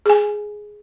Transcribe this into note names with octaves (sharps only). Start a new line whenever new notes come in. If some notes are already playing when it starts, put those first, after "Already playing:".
G#4 G#5